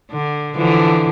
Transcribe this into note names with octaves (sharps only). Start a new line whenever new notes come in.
D3
D3 E3 F3